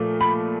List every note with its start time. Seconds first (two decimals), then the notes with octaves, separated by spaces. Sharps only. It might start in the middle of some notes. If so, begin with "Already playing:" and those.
Already playing: A#2 F3 A3
0.21 B5